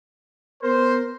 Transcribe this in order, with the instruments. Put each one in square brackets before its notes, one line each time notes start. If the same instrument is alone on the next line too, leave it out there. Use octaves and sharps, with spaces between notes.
[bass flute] B3 [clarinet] A#4 [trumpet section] C5